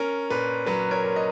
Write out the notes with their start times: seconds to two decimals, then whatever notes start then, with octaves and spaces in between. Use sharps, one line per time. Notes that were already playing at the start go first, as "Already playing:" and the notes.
Already playing: C#4 A#4
0.30 A#2 B4
0.66 F#3 B4
0.91 A#4 C#5
1.04 A#2
1.16 D#5